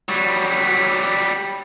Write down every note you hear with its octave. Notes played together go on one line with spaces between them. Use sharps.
F#3 G3